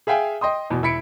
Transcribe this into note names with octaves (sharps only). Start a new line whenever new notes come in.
G#4 E5 F5 G5 G#5
D#5 G5 C6 D#6
E2 B2
E1 E4 B5 B6 C#7 D7